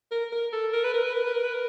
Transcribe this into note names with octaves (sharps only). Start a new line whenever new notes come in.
A#4
A#4
A4
A#4
B4
A#4
B4
A#4
B4
A#4
B4
A#4